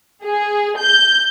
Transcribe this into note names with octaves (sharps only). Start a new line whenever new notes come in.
G#4
G6